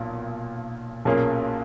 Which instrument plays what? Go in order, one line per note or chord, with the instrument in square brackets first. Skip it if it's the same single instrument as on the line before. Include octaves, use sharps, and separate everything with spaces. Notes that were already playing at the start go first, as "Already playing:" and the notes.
Already playing: [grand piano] B1 A#2 A#3
B1 A#2 A#3 C#4 G#4